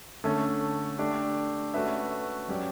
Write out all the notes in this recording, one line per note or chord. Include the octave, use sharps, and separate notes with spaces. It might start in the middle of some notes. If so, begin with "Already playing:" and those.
D3 A3 C#4
A3 D4 G4 D5
A3 C#4 F#4 B4 E5
F#3 C#4 G4 D5